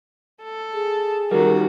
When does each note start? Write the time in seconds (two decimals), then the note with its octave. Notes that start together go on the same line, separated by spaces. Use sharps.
0.42 A4
0.74 G#4
1.31 D#3 G3 F#4 A#4